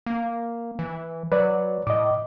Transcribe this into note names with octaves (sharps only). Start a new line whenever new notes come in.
A#3
E3
F#3 B4 D5
A2 D#5 D6